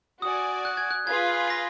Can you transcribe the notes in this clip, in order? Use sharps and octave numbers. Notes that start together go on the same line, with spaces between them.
F#4 D5 G#5 D#6
F#6
G#6
F#6
F4 G#4 B4 F5 G#6
A#6